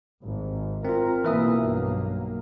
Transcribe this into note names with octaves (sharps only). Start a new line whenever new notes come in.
G#1
C4 F4 A#4
B1 E3 A#3 E5 D#6
G2